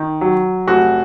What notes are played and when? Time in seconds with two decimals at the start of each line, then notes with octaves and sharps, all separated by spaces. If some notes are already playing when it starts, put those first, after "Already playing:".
Already playing: D#3
0.21 F#3
0.67 F1 F#4